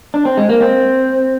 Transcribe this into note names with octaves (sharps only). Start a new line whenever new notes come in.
D4
C4
G#3
A#3
C4